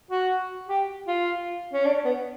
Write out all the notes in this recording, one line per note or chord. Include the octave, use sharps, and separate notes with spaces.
F#4
G4
F4
C#4
D4
B3